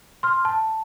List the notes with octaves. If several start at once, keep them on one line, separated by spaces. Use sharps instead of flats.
C6 F6
A5